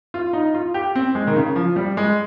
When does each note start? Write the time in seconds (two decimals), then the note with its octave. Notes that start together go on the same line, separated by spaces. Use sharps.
0.14 F4
0.33 D#4
0.54 F4
0.74 G4
0.95 C4
1.15 G#3
1.27 D#3
1.36 C#3
1.56 F3
1.76 G3
1.97 G#3